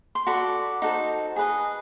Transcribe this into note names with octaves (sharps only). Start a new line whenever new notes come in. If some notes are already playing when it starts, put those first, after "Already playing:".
C6
F#4 A4 D5 B5
D#4 F#4 A4 C5
G#4 B4 D#5